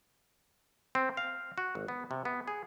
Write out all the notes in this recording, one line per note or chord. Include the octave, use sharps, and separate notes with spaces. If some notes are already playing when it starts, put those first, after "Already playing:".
C4
F5
F#4
G#1
B3
C3
B3
G#4